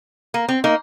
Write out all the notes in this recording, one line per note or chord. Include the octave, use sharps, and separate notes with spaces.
A#3
C4
A#3 D#4